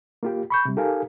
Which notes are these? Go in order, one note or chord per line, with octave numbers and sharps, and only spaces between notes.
A#3 F4 G4
B5 C#6 G6
C3 G3
D#4 G4 A4 A#4 F5 G#5